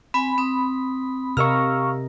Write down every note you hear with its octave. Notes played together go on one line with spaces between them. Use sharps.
C4 G#5 B5
C4 D#6
C3 A#4 D#5 F5 A#5 C#6 E6 F6